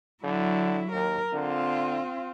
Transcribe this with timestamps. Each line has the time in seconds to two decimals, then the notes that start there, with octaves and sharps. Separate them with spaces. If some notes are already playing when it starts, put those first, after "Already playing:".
0.24 D3 F#3 E4
0.92 D#2 A#4
1.34 D3 C4 F4